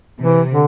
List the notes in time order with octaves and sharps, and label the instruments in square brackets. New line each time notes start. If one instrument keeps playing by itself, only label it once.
[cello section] C3 [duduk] E3
[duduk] D3